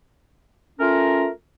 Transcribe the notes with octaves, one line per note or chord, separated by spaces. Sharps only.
A3 C#4 F4 A#4